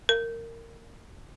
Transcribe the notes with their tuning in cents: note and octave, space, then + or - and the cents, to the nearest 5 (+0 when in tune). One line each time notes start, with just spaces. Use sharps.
A#4 -20